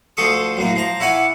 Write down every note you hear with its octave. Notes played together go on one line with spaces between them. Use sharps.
D2 F3 A4 C#6 D#6
F#2 A2 A#3
F3 A#5
E4 C#5 F#5 G#5 D6